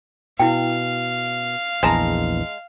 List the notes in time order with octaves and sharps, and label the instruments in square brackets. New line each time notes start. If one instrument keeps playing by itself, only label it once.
[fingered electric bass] B2 [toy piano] E4 G5 [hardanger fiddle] F5
[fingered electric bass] A#1 E2 [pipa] G#3 A5 A#5